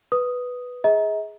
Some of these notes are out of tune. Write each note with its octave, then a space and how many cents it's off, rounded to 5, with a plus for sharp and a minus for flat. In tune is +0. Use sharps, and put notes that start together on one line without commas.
B4 +0 D#6 +0
G#4 +0 D#5 +45 A#5 +20